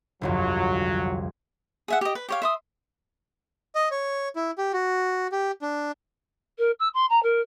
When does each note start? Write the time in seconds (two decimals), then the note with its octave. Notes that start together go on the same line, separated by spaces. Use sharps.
0.22 G1 C2 F2 F#3
1.88 G#4 E5 F#5
2.01 G4 D#5
2.15 B4
2.29 G4 C#5 F5
2.42 E5 C6 D#6
3.75 D#5
3.91 C#5
4.36 E4
4.58 G4
4.73 F#4
5.32 G4
5.62 D4
6.58 A#4
6.79 E6
6.94 C6
7.10 A#5
7.23 A#4